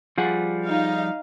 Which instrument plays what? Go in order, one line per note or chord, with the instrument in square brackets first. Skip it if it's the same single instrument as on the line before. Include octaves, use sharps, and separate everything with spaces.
[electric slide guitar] F3 G3 [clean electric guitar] F4 G#4 F#5
[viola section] D#4 F5